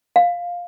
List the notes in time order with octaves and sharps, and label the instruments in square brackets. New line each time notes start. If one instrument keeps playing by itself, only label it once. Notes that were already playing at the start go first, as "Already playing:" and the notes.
[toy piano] F5